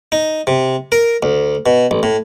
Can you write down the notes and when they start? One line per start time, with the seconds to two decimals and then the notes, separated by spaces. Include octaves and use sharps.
0.12 D#4
0.47 C3
0.92 A#4
1.23 D2
1.66 B2
1.91 A1
2.03 A2